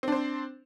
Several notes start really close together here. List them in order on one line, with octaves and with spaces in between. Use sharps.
C4 D4 C5